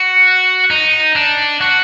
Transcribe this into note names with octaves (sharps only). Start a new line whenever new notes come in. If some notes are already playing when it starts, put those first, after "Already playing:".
Already playing: F#4
D#4
D4
F#4